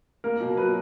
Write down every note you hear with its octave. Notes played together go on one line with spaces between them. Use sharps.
A#3 A#4
B2
F#3 B4